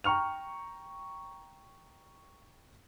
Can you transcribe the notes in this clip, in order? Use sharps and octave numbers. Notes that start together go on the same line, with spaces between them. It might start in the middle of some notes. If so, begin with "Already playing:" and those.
G5 A#5 C#6 F6 F7